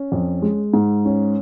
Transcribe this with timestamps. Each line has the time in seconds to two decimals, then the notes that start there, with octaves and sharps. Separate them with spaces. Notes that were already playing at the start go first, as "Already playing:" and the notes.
Already playing: C#4
0.12 F2
0.42 G#3
0.74 G#2
1.05 C#4